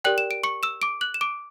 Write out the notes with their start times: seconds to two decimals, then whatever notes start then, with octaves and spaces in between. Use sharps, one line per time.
0.04 G4 A#4 D5 G5 F#6 F#7
0.18 E7
0.31 D7
0.43 C#6 C#7
0.63 E6 E7
0.82 D6 D7
1.01 F#6 F#7
1.14 E7
1.21 D6 D7